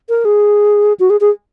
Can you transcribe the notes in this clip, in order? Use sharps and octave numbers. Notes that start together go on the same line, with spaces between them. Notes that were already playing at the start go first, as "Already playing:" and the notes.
A#4
G#4
F#4
G#4
G#4